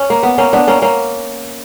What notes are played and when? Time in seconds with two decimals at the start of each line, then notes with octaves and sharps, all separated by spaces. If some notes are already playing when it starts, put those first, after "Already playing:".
Already playing: C#4
0.10 A#3
0.23 B3
0.38 A#3 C#4
0.53 B3 D4
0.67 A#3 C#4
0.82 A#3 C#4